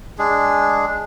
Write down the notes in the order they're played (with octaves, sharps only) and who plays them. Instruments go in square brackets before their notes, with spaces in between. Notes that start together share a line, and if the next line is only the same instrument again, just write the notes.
[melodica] G#3 D4 G#4